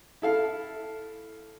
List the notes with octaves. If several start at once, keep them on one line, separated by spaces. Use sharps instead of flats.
E4 A4 F5